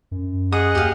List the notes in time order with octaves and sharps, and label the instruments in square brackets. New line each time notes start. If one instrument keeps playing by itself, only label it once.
[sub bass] F#2
[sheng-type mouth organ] G#4 D#5 F#5 [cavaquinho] D#6
[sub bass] D#2 [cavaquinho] G4 F5